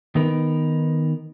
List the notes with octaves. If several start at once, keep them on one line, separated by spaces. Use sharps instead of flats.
D#3 B3 D#4 A#4 B4